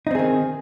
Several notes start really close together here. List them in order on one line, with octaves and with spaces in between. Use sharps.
D#4 C4 G#4 D#3